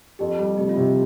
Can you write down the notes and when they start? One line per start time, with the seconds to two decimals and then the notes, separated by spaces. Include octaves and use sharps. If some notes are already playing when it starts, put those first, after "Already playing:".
0.19 F2 G4
0.39 G3
0.58 F1 G4
0.69 F4
0.77 C3 G4